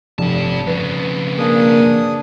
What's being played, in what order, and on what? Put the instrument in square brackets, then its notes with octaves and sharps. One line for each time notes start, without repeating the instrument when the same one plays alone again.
[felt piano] F1 [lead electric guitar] G2 A5
[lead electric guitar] F2 C#3 [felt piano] B4
[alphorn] A#3 [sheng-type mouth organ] D4 G#4 D#6